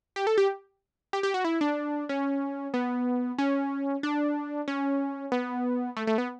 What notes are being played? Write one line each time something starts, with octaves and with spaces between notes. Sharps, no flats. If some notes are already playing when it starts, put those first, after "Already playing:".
G4
A4
G4
G4
G4
F#4
E4
D4
C#4
B3
C#4
D4
C#4
B3
A3
A3
B3